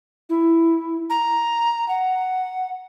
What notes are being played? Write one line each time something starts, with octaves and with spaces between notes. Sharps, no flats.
E4
A#5
F#5